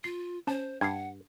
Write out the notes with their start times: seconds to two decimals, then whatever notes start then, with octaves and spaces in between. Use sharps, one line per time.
0.04 F4 C7
0.47 C#4 C5 A5
0.81 G2 F#5 G#6 C7